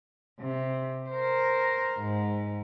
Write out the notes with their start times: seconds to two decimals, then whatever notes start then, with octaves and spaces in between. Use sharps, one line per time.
0.40 C3
1.10 A#4 C5
1.98 G#2